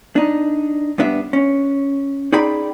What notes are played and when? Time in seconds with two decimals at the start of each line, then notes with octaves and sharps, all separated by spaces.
0.16 D4 D#4
0.98 G2 B3 D4 E5
1.33 C#4
2.32 D#4 G#4 D5 G5 B5